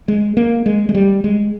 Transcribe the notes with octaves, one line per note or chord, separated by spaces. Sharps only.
G#3
A#3
G#3
G#3
G3
G#3